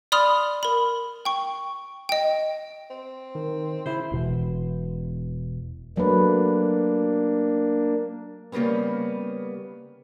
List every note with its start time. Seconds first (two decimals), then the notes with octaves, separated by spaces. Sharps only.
0.12 D5 B5 C6 D#6 F6 F7
0.63 A#4 B5
1.25 G5 C#6
2.09 D#5 G5
2.90 C4
3.35 D#3
3.86 C#3 E4 C5
4.12 E1 B2 E3
5.97 F#3 A3 A#3 D4 B4
8.52 C#3 G3 A#3 B3 C#4